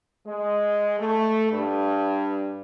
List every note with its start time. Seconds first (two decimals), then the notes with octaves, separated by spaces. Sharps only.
0.26 G#3
0.99 A3
1.50 G2